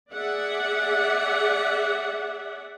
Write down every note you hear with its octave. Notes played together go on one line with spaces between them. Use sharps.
G#4 D5 E5 F#5